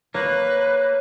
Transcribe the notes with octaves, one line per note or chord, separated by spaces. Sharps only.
A#3 B4 C#5 F#6